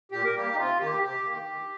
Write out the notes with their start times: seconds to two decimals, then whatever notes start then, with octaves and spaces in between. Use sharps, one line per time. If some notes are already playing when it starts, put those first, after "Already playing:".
0.12 A#2 G4
0.24 A#4
0.35 G3 A#3 G4
0.53 D#4
0.57 C3 F4
0.80 D#3 A#3 G4
1.03 C3 G4
1.24 D#3 A#3
1.47 D#3